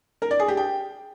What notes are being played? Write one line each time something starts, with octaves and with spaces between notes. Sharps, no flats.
A#4
D5
G#4
G4
G5